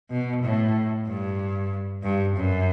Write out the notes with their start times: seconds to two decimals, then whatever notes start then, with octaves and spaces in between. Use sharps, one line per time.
0.11 B2
0.43 A2
1.07 G2
2.03 G2
2.36 F#2